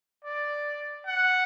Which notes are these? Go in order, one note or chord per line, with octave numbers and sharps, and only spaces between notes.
D5
F#5